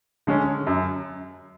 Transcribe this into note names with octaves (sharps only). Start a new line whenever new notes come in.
D3 G#3 C#4
F#2